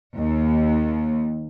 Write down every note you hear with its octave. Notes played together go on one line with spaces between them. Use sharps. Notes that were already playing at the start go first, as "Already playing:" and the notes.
D#2